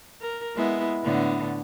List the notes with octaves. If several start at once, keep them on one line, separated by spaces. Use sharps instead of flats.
A#4
G#3 B3 E4
A2 D3 B3